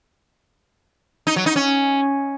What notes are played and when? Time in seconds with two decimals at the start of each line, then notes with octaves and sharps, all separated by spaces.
1.27 D#4
1.36 F#3
1.46 D#4
1.56 C#4